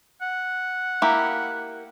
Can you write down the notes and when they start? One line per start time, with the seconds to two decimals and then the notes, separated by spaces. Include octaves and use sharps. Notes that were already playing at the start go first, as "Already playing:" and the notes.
0.21 F#5
1.02 A#3 E4 G4